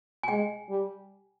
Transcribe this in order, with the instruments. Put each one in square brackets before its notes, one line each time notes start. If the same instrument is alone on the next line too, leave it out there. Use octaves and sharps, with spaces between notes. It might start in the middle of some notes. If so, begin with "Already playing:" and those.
[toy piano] G#5
[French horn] G#3 [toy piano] G5
[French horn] G3